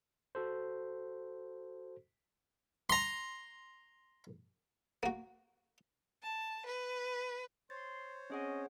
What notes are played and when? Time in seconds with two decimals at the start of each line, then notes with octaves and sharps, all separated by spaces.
0.35 F#4 A4 C5
2.90 A#5 C6
5.03 A#3 F#4
6.23 A5
6.66 B4
7.70 C5 C#5 C6 A6
8.30 C4 C#4 G#4 D#5 F#5